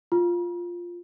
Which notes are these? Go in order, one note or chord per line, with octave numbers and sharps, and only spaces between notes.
F4